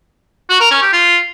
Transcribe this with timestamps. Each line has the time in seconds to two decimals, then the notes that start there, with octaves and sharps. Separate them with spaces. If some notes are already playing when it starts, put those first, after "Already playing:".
0.49 F#4
0.60 A#4
0.71 C#4
0.82 G4
0.93 F4